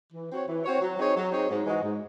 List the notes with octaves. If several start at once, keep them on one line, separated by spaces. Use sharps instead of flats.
E3
C4 F#4 C#5
E3
C4 F#4 C#5
F#3
C4 D#4 G#4 C#5
F#3
C4 D#4 G#4 C#5
G#2
E3 G#3 D#4 F#4
G#2